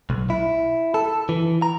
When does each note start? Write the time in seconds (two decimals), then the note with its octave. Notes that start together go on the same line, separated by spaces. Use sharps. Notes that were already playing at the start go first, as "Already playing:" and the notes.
0.10 B1
0.30 E4
0.94 A4
1.29 E3
1.62 A#5